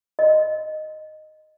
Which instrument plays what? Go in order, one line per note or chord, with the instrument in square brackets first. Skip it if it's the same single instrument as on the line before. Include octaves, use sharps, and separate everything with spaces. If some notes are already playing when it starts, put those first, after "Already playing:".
[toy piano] D#5